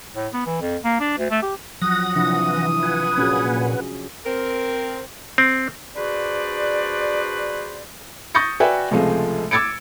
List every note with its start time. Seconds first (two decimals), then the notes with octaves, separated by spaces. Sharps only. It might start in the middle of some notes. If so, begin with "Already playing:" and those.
0.15 A2
0.33 B3
0.46 E3
0.61 F2
0.84 A#3
1.00 D4
1.18 D2
1.30 A3
1.43 G4
1.82 F3 F#3 F#5 D#6 A#6
2.16 C3 E3 F3 D4
2.83 F4 B4 F#5 G#5
3.18 A#2 C#4 F#4 G#4
4.25 C4 A#4
5.38 C4
5.96 D4 F#4 G#4 B4 C5 D5
8.35 C#6 D#6 G6 A6 A#6 C#7
8.60 F#4 B4 D5 E5 G5 G#5
8.91 C#2 C3 F3 G#3 A3
9.51 D6 E6 G#6 A6 C#7 D7